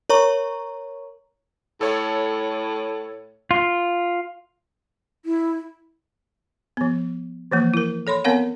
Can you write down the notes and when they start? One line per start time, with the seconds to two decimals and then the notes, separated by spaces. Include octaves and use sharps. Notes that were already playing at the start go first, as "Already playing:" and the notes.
0.10 A#4 C#5 A#5 C#6
1.81 A2 A4 C#5 E5
3.51 F4
5.25 E4
6.77 F3 B3
7.51 E3 F3 A#3
7.74 E4 A#4
8.07 A4 C#5 B5 C6
8.24 B3 C4 A#4 C#5 F5 F#5